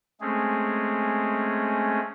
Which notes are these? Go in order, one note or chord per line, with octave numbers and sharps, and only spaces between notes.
G#3 A3 C4 C#4 G#4